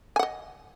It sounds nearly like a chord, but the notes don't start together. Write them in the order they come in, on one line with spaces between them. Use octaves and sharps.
G#5 F#5 D#5